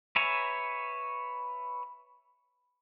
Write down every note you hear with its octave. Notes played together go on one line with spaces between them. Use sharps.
B4 C#5 E5 G#5 A#5